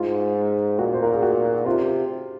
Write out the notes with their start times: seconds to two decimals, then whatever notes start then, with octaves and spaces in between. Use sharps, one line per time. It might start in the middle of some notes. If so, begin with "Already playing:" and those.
Already playing: G#2 F4
0.78 A#2 F#4
0.94 C5
1.03 A#4
1.13 G#4
1.22 F#4
1.66 C3 F4